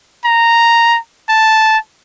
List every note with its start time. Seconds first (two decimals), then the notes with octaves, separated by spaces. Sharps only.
0.25 A#5
1.29 A5